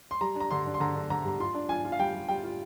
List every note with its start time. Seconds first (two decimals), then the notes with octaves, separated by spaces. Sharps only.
0.11 C6
0.21 G3 A#5
0.35 D4 A#5
0.51 D3 C6
0.66 D4
0.74 C6
0.80 D3 A#5
0.96 D3
1.10 D3 A#5
1.25 G3 A#5
1.40 F4 C6
1.54 D4
1.69 F4 G#5
1.85 F4
1.92 F5
1.99 G3 G5
2.14 G3
2.29 G3 G5
2.44 F4